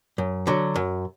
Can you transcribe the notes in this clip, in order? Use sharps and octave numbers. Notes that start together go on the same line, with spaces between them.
F#2
D3 F#3
F#2